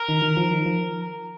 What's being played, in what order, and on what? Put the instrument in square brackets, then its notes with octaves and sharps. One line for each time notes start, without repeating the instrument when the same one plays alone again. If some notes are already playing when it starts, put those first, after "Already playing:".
Already playing: [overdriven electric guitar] A#4
[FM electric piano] D#3
D#3
F3
D#3
F3